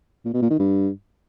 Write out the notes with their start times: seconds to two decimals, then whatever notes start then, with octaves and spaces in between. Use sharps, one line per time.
0.25 A#2
0.33 B2
0.42 A#2
0.50 D#3
0.59 G2